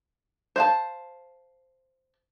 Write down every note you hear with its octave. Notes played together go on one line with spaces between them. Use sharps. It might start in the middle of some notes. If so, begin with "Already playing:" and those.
C5 F5 A5